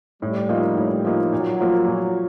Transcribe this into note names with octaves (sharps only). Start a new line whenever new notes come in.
A2 G3
F3 A#3 D#4
A2
F3 A#3 D#4
A#2 F#3
F3 A#3
A#2